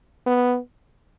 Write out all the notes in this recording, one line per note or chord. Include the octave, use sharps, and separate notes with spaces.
B3